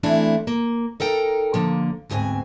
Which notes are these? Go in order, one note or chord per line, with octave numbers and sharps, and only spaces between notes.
E3 A3 C4 D4 E4
A#3
D#4 A4 A#4 G5
D3 F3 A#3
D2 G#2 B2 C4 G#5